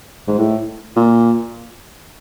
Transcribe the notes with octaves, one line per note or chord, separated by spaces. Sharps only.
G#2
A2
A#2